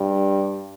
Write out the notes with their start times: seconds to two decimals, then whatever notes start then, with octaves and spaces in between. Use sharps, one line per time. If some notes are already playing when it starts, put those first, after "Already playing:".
Already playing: G2